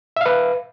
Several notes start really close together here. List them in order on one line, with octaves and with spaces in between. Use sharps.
E5 F5 B4